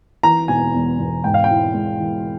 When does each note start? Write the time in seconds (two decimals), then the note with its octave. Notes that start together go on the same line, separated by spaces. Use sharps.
0.23 E3 A#5
0.48 E1 G#5
0.74 E2
0.99 E1
1.24 G#2 G5
1.34 F5
1.44 G5
1.49 E4
1.74 G#3
2.00 E3